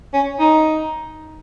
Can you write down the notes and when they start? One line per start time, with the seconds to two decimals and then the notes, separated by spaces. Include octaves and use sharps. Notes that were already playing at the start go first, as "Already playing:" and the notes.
0.13 C#4
0.39 D#4